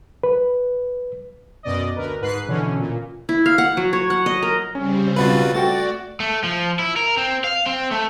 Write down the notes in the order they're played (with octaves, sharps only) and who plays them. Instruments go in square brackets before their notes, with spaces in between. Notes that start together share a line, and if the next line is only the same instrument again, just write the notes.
[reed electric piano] B4
[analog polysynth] F#2 B2 D5 D#5
D2 A#4 B4
G#2 B4 F#6 C7
B2 D3 E3 C#4
A#2
[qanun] E4
F5
F#5
F#3
C#5
F#5
D#5
A#4
[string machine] C#3 G3 C4 [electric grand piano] C#4
[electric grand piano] B1 B5 A6 [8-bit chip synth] F4 F#4 B4
[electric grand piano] A3 F#4 G5 [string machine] D5 [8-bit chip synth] A6
[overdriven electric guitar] A3
F3
E4
A#4
C4
F5
C4
A3